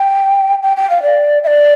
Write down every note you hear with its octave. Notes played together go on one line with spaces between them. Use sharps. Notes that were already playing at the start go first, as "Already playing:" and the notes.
Already playing: G5
G5
G5
F5
D5
E5
D5